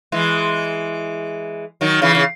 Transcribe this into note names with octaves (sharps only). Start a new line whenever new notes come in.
E3 G#3
D#3 F#3
C#3 E3
C#3